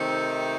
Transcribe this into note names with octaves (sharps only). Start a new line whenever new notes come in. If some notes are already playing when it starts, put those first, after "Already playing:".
Already playing: C3 D#3 A3 C4 D#4